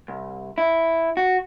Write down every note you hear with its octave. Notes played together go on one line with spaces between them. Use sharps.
C2
E4
F#4